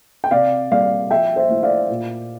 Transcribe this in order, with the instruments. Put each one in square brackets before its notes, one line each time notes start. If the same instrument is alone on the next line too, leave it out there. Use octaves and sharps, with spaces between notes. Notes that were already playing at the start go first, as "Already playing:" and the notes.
[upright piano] G5
C3 D5 F5
G3 A#3 D5 F5
F3 E5 G5
C5 E5
A3 E4
D5 F5
A#2